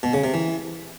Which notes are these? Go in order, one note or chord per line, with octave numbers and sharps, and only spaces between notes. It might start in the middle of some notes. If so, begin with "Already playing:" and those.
B2
C#3
C3
E3